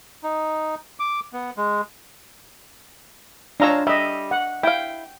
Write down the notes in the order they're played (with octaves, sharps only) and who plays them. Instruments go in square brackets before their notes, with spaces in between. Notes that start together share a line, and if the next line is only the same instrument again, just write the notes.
[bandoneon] D#4
D6
B3
G#3
[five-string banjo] G#3 F4 C#5 [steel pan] D4 A#5 E6
[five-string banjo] G3 [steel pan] D#5 E5
[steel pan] F#5
[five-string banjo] E4 F5 [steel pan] G5